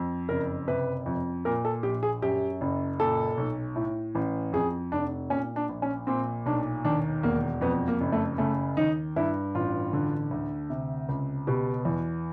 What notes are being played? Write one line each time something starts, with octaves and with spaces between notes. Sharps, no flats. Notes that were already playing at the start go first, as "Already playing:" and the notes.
Already playing: F2
F#1 A#4
C3 B4
F2
A#2 A#4
A4
A#1 G4
G#4
F#2 G4
F#1
A#2 A4
B1
A2
A1
F2 G#4
F1 D4
A#2 C#4
D4
A#1
C#4
A#2 C4
B1 D4
D#2 D4
E1 A#3
F2 B3
A#3
F#1
A3
C#3 A3
D#2 D#4
G2 E4
A1 F4
D3
D2
C3
C#2
B2 G4
E2